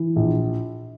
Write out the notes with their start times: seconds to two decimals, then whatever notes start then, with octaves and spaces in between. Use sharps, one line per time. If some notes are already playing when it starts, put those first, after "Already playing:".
Already playing: E3
0.16 A#1